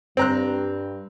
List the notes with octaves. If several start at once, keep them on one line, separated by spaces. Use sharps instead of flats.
G2 C4 A#5 F#6